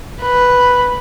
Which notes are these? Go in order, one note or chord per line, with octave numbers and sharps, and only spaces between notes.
B4